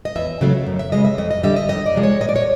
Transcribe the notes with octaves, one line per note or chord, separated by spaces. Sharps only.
D#5
E2 E5
C#3 F#3 A3
F#2
E5
C#3 F3 G#3 D#5
E5
F2 D#5
D#5
D3 G3 E5
D#5
F2 D#5
D5
C3 F3 G#3
C#5
A#2 D#5
D5
C#5